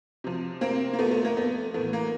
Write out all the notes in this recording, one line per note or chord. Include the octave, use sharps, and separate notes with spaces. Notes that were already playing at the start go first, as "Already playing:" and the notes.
C3 F3
A#3 C4
A#3
A3 B3
A3
A#3
A3 B3
A2 E3 A3 B3
A#3